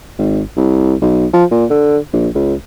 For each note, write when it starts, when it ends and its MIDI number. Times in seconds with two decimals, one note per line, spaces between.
0.19 0.43 32
0.57 0.94 36
1.02 1.26 35
1.34 1.45 53
1.51 1.65 46
1.71 1.98 50
2.14 2.29 34
2.35 2.55 37